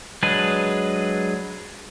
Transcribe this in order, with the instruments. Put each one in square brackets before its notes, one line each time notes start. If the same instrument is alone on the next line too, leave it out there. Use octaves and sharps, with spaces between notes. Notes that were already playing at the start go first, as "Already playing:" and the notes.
[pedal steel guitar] F#3 G#3 D4 G#4 B4